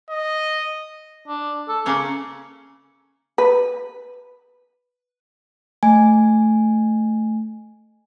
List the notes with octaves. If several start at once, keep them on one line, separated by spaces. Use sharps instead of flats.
D#5
D4
A4
C#3 A#3 C#4 C#5
B4
A3 G#5